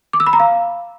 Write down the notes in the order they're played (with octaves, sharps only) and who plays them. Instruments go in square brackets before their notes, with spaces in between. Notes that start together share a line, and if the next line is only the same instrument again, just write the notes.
[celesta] D6
E6
B5
A#5
F5